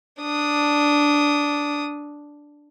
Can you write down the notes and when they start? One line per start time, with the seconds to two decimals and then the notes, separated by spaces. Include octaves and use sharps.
0.21 D4 D#6